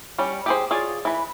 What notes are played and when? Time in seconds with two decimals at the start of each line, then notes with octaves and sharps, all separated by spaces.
0.18 G3 C#4
0.46 G4 G#4 C5
0.71 F4 G#4 C#5 D5
1.05 E3 B4